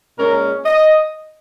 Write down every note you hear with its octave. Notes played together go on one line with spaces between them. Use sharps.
A#2 G#3 C#4 A#4
D#5